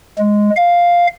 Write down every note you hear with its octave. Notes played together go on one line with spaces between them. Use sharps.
G#3
F5